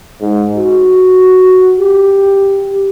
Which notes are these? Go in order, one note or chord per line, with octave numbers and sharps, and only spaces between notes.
G#2
F#4
G4